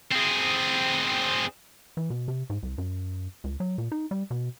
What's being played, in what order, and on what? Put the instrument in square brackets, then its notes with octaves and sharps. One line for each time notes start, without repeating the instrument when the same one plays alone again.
[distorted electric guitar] C4 G#4
[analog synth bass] E3
B2
C3
G#2
C2
F#2
C#2
F#3
A#2
D#4
G3
B2